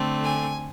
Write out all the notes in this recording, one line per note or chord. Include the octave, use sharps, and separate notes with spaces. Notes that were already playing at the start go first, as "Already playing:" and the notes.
Already playing: D3 A3 C4
G#5